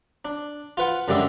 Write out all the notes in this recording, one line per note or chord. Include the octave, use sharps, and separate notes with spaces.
D4
F4 B4 F#5
F#2 D3 G3 G#3 D5 E5